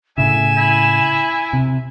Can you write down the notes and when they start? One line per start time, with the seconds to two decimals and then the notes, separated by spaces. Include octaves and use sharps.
0.18 A2 C#3 E5 G#5 E7
0.57 E4
1.53 C3